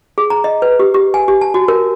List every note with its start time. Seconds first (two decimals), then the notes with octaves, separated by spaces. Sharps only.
0.18 G#4
0.30 A#5
0.44 D#5
0.62 B4
0.80 G4
0.94 G4
1.14 G#5
1.28 G4
1.41 A5
1.54 F#4
1.68 A#4